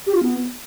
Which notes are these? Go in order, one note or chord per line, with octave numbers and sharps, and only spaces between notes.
G4
F4
B3